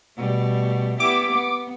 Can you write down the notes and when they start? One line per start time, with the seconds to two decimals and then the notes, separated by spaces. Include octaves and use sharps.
0.17 B2 G3 A3
1.00 B3 E4 G4 D6
1.32 B3